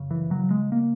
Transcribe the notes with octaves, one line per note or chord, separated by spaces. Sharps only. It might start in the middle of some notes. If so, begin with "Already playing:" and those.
Already playing: F#2 C#3
E3
C#3 F#3
G#3
A#3